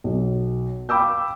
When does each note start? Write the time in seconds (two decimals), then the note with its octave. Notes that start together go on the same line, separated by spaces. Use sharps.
0.04 B1
0.89 F5 G5 B5 D6 E6 G6